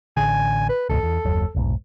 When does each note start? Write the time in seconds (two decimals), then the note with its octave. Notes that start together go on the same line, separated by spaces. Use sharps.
0.17 A1 D3 G#5
0.69 B4
0.89 E1 C#2 G#2 A4
1.03 E2
1.25 F#1 D#2 F#3
1.54 F1 B1 G#2